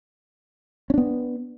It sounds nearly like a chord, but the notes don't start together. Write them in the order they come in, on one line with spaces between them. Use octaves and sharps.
C#4 D4 B3